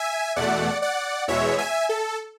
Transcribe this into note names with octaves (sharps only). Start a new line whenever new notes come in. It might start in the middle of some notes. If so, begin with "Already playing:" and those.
Already playing: E5 G#5
E2 B2 A3 D5 F#5
D5 F#5
E2 B2 G#3 C#5 E5
E5 G#5
A4